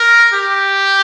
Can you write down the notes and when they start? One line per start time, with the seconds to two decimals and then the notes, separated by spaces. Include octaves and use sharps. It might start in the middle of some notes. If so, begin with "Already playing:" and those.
Already playing: A#4
0.33 G4